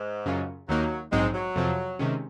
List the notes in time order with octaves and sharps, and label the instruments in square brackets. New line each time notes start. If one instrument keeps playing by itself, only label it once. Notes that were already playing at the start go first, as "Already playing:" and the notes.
Already playing: [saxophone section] G#2
[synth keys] F#2 C#3 F#3 C#4 F4
[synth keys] D#2 D#3 A#3 D#4 A#4 [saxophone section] F#3
[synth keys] A#1 G#2 F#3 C4 D#4 [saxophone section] G#3
[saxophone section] F#3
[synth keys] F2 C3 F3 C4 F4
C3 D#3 G#3 C#4